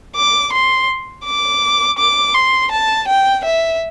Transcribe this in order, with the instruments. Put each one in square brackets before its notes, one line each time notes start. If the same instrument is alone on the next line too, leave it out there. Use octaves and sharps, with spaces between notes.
[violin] D6
C6
D6
D6
C6
A5
G5
E5